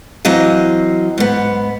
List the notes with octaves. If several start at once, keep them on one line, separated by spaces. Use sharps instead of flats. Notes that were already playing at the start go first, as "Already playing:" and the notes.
E3 F#3 C4 D#5 F5
G#2 B3